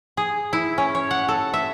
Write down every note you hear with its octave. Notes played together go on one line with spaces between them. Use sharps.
G#4
E4
C#4
C#5
F#5
A4
E5